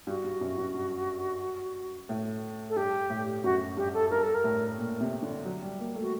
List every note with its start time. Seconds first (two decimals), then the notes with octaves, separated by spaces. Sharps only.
0.07 G2 F#4
0.24 G2
0.41 F#2
0.58 F#2
0.74 G2
2.09 A2
2.69 A4
2.76 G2 G4
3.10 A2
3.43 F#2 F#4
3.77 G2 G4
3.94 A4
4.10 G2 A#4
4.23 A4
4.34 A#4
4.44 A2
4.78 A#2
5.01 C3
5.22 D3
5.45 F#3
5.62 G3
5.79 A#3
5.96 A3
6.01 F#4